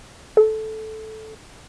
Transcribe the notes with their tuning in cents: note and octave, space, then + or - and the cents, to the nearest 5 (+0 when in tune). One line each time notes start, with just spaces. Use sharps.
A4 -10